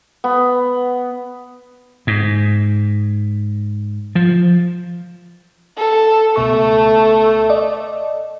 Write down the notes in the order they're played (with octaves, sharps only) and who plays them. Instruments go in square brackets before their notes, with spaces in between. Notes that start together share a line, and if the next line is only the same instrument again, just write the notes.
[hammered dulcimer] B3
[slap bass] G#2
F3
[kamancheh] A4
[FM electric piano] C#2 B2 C#6 [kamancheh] A3
[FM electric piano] D5 D#5